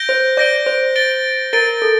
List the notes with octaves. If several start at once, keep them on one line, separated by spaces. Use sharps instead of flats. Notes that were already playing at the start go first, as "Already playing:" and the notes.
Already playing: G6 A#6 D7 G7
C5
D5 G6 A#6 D7 G7
C5
A6 D7 G7
A#4 A6 D7 G7
A4